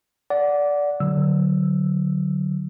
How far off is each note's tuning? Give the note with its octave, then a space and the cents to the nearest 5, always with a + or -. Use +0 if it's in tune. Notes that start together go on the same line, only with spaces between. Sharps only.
D5 -15 F#5 -5
D3 +0 F#3 +0 E6 +0